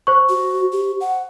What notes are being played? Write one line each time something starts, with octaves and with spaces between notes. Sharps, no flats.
C5 C#6
F#4
G4
F#5